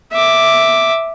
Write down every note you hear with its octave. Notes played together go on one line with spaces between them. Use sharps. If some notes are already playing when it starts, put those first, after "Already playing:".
E5 D6